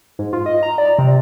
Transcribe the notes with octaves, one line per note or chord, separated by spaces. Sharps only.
G#2
F4
D#5
A#5
D5
C3